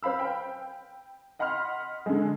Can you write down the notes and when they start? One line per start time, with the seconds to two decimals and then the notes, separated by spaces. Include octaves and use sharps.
0.03 B4 C5 F5 B5 E6
0.19 G5
1.39 D#5 F#5 B5 C6 F6
2.06 D3 G#3